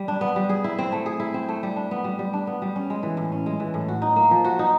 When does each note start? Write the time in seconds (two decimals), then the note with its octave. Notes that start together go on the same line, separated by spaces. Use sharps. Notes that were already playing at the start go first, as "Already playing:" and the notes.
Already playing: G3
0.08 D4
0.21 B3
0.36 G3
0.49 G#4
0.64 E4
0.79 C4
0.92 A3
1.06 G#4
1.20 E4
1.34 C4
1.49 A3
1.63 G3
1.76 D4
1.91 B3
2.04 G3
2.19 G3
2.33 D4
2.47 B3
2.62 G3
2.76 C#4
2.90 G#3
3.03 E3
3.17 A2
3.32 C#4
3.46 G#3
3.60 E3
3.74 A2
3.88 F#4
4.02 D#4
4.16 A#3
4.31 F3
4.45 F#4
4.59 D#4